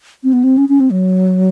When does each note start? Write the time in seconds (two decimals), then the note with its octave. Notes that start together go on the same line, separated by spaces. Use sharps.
0.24 C4
0.33 B3
0.44 C4
0.57 C#4
0.69 C#4
0.80 C4
0.91 F#3